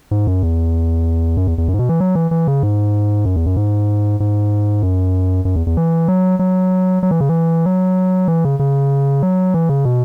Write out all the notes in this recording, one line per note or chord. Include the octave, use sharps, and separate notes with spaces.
G#2
F#2
E2
F#2
E2
E2
F#2
G#2
B2
E3
F#3
E3
E3
C#3
G#2
F#2
E2
F#2
G#2
G#2
F#2
F#2
E2
E2
E3
F#3
F#3
F#3
E3
C#3
E3
F#3
E3
C#3
C#3
F#3
E3
C#3
B2